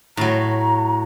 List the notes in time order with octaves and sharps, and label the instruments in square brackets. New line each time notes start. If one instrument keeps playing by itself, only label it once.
[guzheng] A2 F#3 [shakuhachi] A#5